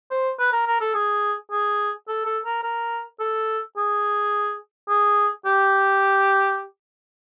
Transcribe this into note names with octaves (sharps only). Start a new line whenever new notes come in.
C5
B4
A#4
A#4
A4
G#4
G#4
A4
A4
A#4
A#4
A4
G#4
G#4
G4